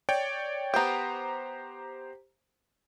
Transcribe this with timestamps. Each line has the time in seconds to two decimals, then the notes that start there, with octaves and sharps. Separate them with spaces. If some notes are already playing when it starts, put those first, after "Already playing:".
0.09 C#5 D5 G5
0.74 B3 G4 C5 G5 A#5